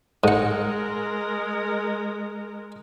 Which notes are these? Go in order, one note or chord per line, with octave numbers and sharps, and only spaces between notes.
G#2 G#3 A#4 F#5